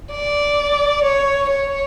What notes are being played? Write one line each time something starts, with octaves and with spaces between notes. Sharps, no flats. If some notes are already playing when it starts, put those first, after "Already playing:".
D5
C#5
C#5